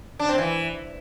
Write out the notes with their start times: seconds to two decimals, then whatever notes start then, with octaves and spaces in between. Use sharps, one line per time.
0.19 D4
0.29 C4
0.38 E3